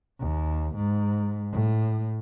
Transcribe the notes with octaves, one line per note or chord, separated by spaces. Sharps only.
D#2
G#2
A2